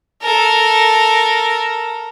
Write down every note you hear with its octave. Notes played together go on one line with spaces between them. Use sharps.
A4 A#4